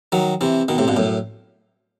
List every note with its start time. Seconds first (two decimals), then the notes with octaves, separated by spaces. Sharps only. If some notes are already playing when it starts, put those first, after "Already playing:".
0.12 D#3 F#3
0.41 C3 E3
0.68 B2 D#3
0.78 A2 C3
0.88 G2 B2
0.97 F#2 A2